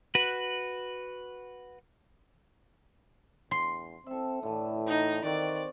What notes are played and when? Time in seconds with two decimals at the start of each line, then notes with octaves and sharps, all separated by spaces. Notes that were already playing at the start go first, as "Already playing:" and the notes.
0.15 F#4 B4
3.51 E2 C6
4.06 C4 A4 E5
4.43 A2 D3 E3
4.87 D#4
5.24 D#3 C4 F#4 C5 D5